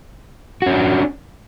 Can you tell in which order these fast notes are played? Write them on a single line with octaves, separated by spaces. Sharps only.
F#4 C#4 D4